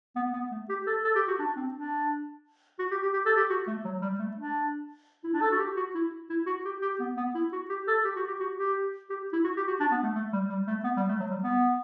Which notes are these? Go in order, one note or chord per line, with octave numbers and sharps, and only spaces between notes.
B3
B3
A3
G4
A4
A4
G4
F#4
D4
C4
D4
F#4
G4
G4
G4
A4
G4
F#4
A3
F#3
G3
A3
D4
E4
D4
A4
F#4
G4
F#4
E4
E4
F#4
G4
G4
B3
B3
E4
F#4
G4
A4
G4
F#4
G4
F#4
G4
G4
E4
F#4
G4
F#4
D4
B3
A3
A3
G3
G3
A3
B3
G3
A3
F#3
G3
B3